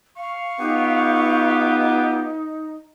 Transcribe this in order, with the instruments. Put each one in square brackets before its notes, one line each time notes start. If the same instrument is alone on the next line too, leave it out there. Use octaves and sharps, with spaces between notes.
[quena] F5 [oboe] C#6
[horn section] B3 F4 G4 [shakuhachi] D#4